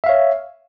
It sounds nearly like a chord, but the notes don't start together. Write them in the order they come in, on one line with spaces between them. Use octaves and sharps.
E5 F5 C#5